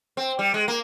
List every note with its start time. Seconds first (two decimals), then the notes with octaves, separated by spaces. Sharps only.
0.17 C4
0.39 G3
0.54 G#3
0.68 A#3